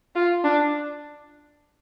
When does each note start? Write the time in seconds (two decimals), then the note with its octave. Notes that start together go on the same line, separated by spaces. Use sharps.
0.15 F4
0.44 D4